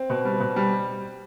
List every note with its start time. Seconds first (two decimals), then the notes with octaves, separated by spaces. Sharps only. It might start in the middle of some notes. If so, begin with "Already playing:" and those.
Already playing: C4
0.10 B2
0.25 G3
0.40 B2
0.56 G3